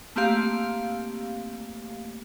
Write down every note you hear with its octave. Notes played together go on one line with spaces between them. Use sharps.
A3 A#3 C4 G4 F5